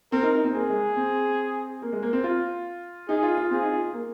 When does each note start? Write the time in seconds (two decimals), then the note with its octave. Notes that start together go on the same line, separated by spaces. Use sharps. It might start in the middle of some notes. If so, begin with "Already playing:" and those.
0.12 C4 A#4
0.23 D#4
0.34 D#4
0.44 C4
0.54 A#3 G#4
0.69 G#3
0.96 C4
1.82 A#3
1.92 G#3
2.03 A#3
2.13 C4
2.24 F4
3.09 D#4 G#4
3.23 F4
3.37 F4
3.51 C4 G#4
3.62 D#4
3.72 F4
3.93 A#3